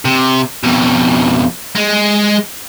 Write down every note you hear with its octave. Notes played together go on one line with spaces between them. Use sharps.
C3
F2 B2
G#3